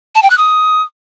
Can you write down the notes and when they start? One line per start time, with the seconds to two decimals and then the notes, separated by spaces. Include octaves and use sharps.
0.15 A5
0.23 G5
0.30 F#6
0.38 D#6